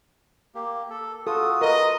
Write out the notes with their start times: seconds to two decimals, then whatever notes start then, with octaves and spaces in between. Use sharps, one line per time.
0.55 A#3 G4
0.90 A4
1.27 F4 F#4 A4 D#6
1.62 A#4 B4 D#5